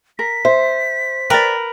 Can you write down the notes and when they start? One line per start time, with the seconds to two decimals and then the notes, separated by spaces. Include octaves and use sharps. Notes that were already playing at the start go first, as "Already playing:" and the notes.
0.19 A#4 B6
0.45 C5 E5
1.30 A#4 B4 D5 G5